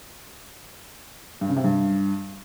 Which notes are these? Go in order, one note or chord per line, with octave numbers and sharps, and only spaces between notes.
G2
C#3
C3
G2